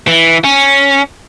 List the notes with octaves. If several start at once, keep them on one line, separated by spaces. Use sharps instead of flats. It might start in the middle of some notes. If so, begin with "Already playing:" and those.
E3
C#4